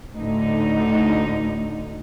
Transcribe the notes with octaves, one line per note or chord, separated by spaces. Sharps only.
D2 A2 D3 D#4